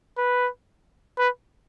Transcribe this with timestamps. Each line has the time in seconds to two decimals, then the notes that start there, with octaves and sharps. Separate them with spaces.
0.18 B4
1.18 B4